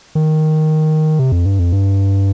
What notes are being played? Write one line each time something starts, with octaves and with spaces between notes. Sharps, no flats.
D#3
C3
F2
G2
F2
G2